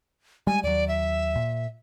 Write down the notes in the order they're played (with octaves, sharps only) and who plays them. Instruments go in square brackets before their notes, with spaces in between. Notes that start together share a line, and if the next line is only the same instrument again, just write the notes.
[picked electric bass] G3 G#3 [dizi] G#5
[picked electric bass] D#2 F#3 [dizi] D5
[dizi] E5
[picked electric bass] A#2